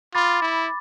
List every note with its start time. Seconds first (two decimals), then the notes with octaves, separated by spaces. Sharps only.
0.14 F4 B5 D6 A6
0.42 E4